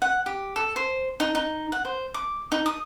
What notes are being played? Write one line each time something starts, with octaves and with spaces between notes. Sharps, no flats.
F#5
G4
A4
C5
D#4
D#4
F#5
C5
D6
D#4
D#6